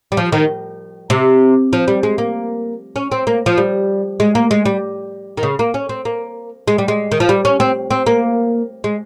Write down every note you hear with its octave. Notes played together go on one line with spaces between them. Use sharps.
G3
F3
D#3
C3
F3
G3
G#3
A#3
C#4
C4
A#3
F3
G3
G#3
A#3
G#3
G3
D#3
C#3
A#3
C#4
C4
A#3
G#3
G3
G#3
D#3
F3
G3
C#4
C4
C4
A#3
G#3